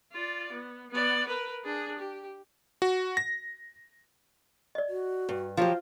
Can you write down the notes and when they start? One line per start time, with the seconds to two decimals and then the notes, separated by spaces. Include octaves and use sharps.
0.12 F4 D5
0.53 B3
0.90 B3 D5
1.29 A#4 B4
1.65 D4 G#4
1.99 G4
2.82 F#4
3.17 A#6
4.75 D5 D#5
4.89 F#4
5.29 G2
5.57 F3 F#3 F4 G4 C5